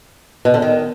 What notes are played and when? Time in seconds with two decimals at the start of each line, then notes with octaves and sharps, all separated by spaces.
0.45 B2
0.54 D3
0.62 D#3